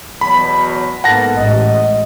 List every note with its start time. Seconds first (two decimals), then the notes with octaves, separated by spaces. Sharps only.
0.21 E2 B2 F#3 B5
1.04 G#2 A#3 B3 A4 F#5 A5 A#6
1.37 A1 G#3 D#5